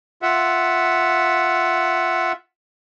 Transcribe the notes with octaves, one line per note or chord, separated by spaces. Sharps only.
F4 E5 F#5